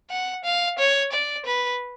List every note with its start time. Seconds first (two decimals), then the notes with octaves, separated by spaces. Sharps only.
0.10 F#5
0.44 F5
0.79 C#5
1.13 D5
1.46 B4